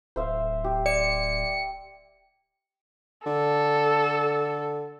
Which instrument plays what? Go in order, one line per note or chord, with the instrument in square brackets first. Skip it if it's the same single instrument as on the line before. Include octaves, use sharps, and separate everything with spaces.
[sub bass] D1 [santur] C5 E5 F5
[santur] G4
[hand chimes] D5 [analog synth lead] C#7
[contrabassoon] D3 [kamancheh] A4